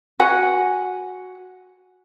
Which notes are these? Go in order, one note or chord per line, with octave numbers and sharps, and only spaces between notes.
F#4 F#5 G#5